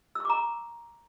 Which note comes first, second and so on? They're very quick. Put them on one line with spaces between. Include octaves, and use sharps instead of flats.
E6 C#6 D6 A#5